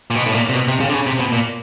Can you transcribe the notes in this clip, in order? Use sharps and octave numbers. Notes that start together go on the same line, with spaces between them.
A#2
B2
A2
A#2
C3
B2
C3
C#3
D3
C#3
C3
B2
A#2